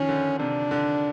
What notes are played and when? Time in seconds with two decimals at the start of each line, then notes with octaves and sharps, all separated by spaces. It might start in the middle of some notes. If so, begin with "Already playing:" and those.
Already playing: D#3 F3 C#4
0.09 D3
0.39 C3 D4
0.71 D3